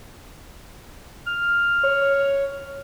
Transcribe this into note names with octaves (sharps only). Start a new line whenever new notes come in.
F6
C#5